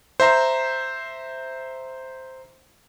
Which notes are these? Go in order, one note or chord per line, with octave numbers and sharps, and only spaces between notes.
C5 E5 A#5 C6